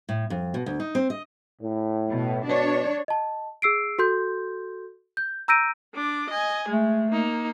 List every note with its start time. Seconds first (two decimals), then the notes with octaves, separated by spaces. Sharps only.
0.09 A2
0.30 F2
0.54 B2
0.66 D2
0.80 D#4
0.95 C4
1.10 D#5
1.61 A2
2.09 B2
2.44 B2 D4 C#5
3.08 D#5 A5
3.62 G#4 E6 C7 D7
3.99 F#4 A4 C6 G6
5.17 G6
5.48 A#5 E6 G6 A#6 D7 D#7
5.94 D4 D6
6.30 D#5 G#5
6.69 G#3 A3
7.11 A#3 D#4